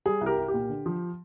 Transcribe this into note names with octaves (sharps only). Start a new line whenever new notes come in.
G3 G#4
C2
G4 A#4
C2
G4
A#2
D3
F3